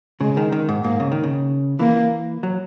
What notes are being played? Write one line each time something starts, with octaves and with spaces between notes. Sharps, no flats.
C#3 G#3
D#3
D#3
G#2
G#2 A#3
C#3
D#3
C#3
E3 A#3
F#3